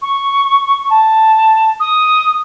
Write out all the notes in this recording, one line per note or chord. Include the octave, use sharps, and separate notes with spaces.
C#6
A5
D#6